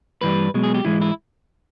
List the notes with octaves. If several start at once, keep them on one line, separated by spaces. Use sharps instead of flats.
G2 E3 G3 B4
B1 B2 G#3
G#4
G4
G#2 E3 G#3 E4
E4